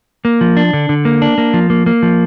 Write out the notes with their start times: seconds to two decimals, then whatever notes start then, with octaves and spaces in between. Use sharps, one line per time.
0.25 A#3
0.41 F3
0.57 D4
0.73 D3
0.89 D3
1.05 A#3
1.22 D4
1.38 A#3
1.54 F3
1.70 A#3
1.86 A#3
2.03 F3